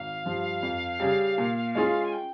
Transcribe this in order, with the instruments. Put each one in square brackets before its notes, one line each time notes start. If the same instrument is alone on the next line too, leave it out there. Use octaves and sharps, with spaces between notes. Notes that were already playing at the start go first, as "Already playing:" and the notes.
Already playing: [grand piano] G#1 [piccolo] F5
[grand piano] G2 F3
F2
C#3 G3
A#2
G#3 C#4 F4 G#4
[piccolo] G#5
G5